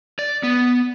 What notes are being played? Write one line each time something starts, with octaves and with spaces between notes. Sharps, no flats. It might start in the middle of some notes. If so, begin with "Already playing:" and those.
D5
B3